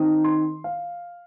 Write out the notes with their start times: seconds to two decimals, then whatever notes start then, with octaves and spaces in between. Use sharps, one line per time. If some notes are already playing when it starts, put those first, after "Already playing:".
Already playing: D#3 C4 D#4 D#6
0.24 C6
0.64 F5